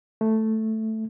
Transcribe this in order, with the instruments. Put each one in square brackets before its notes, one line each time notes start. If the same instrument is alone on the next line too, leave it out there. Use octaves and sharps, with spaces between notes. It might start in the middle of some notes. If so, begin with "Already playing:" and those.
[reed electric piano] A3